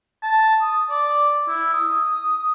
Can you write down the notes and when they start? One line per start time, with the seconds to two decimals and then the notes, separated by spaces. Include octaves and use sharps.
0.23 A5
0.61 D#6
0.90 D5
1.48 E4
1.74 D#6